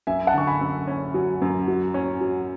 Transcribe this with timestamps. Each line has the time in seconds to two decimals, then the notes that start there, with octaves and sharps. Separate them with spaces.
0.07 F#2 E5 G#5
0.27 F#5 A5
0.34 D3 C#6
0.47 G#5 B5
0.61 F#2
0.87 C#4
1.14 F#3
1.42 F#2
1.68 F#3
1.94 C#4
2.21 F#3